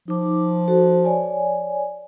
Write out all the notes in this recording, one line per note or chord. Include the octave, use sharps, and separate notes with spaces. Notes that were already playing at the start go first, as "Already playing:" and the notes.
F3 D#4 D6
F#4 A4 C5
C#5 D5 G#5